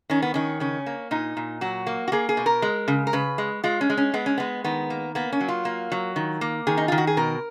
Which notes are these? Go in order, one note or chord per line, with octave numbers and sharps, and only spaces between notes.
D#3 C#4
B3
D#3 C#4
C#3 C#4
A#3
A#2 D#4
A#2
F#3 F#4
A#3
F#4
A#3 G#4
G#4
B2
A#4
G#3
C#3
A#4
C#3 B4
G#3
G#3 F4
C#4
G#3
C#4
G#3 B3
C#4
G#3 B3
D#3 B3
A#3
A#3 B3
C#4
F#3
F4
A#3
F#3
D#3
A#3
D#3 G#4
D#4
D#3 F4
F#4
G#4
B2 A#4